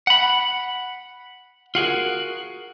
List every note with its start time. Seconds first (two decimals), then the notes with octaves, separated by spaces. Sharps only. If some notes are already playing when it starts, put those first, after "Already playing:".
0.07 F#5 B5
1.75 F4 F#4 G#4 A#4